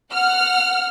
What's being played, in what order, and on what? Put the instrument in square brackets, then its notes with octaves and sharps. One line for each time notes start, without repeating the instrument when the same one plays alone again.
[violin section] F#5 F6